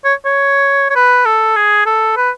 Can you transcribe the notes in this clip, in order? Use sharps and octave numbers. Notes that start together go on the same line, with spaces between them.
C#5
C#5
C#5
B4
A4
G#4
A4
B4